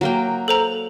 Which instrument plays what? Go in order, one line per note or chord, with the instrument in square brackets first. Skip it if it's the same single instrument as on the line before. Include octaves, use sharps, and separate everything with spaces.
[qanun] F#3 A#3 G5
[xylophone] A4 C5 A#5